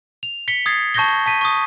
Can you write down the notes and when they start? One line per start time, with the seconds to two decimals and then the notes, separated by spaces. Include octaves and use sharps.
0.23 F7
0.48 B6 C#7 G7
0.66 D#6 G#6 A6 C7
0.94 A5 C#6 G6 G#6 A#6 G7
1.26 A5 B6 D#7
1.41 C#6 D#6